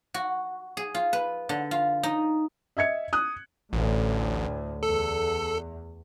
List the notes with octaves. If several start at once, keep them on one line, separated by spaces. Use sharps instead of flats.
F#4
G#4
F4
B4
D3
F4
D#4
D#5 E5 G#6 C#7
D#6 F#6
A1 D2 A2
E2 A4